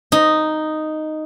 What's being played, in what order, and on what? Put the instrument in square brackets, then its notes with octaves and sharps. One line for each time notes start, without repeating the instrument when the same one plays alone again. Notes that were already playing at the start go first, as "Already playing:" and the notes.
[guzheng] D#4